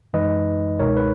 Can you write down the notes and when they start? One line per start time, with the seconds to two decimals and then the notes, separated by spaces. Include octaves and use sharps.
0.13 F#2 E3 G#3 D#4 B4 D#5
0.79 C#2 B2 G#3 D#4 A#4 C#5
0.97 B4